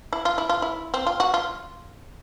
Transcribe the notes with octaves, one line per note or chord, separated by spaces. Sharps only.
E4
F4
E4
F4
E4
C4
F4
F#4
F4